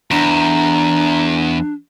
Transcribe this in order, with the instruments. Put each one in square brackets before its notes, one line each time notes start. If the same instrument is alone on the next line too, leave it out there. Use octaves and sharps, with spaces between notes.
[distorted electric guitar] E2 [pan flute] D4 [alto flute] A#5